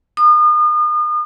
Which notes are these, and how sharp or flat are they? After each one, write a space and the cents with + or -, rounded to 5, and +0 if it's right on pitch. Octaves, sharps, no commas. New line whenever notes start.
D#6 -35